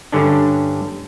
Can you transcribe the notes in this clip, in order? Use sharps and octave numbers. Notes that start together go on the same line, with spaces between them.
G2 D3 C#4 D4